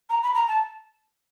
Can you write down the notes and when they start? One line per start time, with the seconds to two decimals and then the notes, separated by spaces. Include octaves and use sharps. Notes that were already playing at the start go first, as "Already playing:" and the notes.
0.10 A#5
0.23 B5
0.35 A#5
0.48 A5